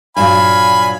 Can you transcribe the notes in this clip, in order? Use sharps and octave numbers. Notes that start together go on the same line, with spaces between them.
G2 A#2 F#3 F5 G#5 B5